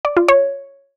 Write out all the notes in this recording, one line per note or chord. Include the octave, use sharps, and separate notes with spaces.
D5
F4
C#5